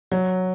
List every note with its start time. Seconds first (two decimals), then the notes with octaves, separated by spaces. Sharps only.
0.12 F#3